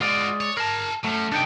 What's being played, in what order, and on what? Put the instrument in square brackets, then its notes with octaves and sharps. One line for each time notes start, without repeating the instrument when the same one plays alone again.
[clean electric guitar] G#3 D5 [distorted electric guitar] F4 F#4
[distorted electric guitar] C#5
[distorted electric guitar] G#4 A5 [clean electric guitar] A#4
[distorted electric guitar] F#3 C#4 [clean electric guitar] A3
[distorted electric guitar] C3 A3 [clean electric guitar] D4 D#4 G5